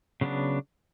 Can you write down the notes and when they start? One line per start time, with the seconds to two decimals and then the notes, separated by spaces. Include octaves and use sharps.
0.21 C#3 F#3 B3 D4